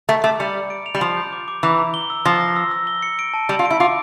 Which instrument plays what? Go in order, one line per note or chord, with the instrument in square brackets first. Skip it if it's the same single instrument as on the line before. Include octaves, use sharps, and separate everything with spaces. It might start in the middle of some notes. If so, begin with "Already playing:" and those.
[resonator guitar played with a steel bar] A3 [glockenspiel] A#5
[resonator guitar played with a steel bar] A3 [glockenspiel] D6
[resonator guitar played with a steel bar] G3 [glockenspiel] C#7
[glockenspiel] D6
D7
F7
[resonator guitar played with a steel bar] G3
[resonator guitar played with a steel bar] F3 [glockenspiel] F7
[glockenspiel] G6
D6
D6
[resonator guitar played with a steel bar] E3 [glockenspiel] A#5
[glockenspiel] A#5
G7
E6
[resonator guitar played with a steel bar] F3 [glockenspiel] A#6
[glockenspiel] A#6
E6
E6
G7
C#7
D7
A5
[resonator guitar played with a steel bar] G3 [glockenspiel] A5
[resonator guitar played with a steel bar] F4
[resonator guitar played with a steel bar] E4 [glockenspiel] D7
[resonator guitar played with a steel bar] F4 [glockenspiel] D6